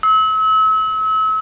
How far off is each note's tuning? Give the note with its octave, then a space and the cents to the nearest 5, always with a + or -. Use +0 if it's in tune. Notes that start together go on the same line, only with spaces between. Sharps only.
E6 -35